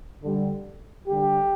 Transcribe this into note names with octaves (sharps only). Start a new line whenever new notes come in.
D3 G3
D3 G3 G4